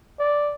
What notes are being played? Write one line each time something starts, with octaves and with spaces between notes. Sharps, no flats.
D5